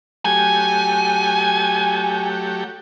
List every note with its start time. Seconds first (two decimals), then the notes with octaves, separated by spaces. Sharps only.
0.25 F#3 A3 G4 G#5